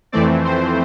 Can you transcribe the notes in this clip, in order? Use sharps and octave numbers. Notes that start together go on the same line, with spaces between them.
F2 E3 A3 C4 D5
C5